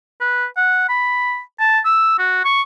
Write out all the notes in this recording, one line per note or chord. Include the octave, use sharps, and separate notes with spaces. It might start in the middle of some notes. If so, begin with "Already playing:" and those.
B4
F#5
B5
A5
E6
F#4
C#6